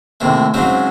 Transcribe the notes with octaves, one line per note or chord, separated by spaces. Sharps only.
D#2 A2 C3 G#3
G#2 C#3 F#3 G#3 C4